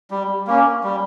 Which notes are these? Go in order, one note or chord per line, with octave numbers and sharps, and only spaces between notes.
G3
A#3 C#4
G3